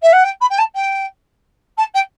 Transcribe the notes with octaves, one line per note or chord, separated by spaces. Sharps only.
E5
F#5
G5
B5
G5
A5
G5
A5
G5